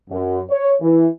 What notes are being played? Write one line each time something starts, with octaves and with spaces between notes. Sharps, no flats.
F#2
C#5
E3